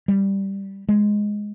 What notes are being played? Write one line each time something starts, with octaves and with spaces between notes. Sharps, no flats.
G3
G#3